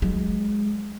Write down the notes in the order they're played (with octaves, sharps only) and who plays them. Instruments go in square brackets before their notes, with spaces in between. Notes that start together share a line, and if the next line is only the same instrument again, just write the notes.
[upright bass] F#3 G#3